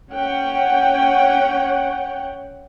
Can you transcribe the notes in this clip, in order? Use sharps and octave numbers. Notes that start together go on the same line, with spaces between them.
C#4 C#5 F#5 G5